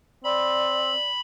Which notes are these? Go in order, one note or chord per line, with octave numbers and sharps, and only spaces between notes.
C4 D5 B5